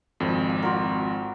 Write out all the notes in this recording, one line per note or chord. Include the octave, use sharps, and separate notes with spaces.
G#1 F2
D6
F4 F#4 A#4